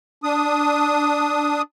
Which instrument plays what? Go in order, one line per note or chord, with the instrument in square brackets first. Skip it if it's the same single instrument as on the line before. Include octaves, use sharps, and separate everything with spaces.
[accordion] D4 D#6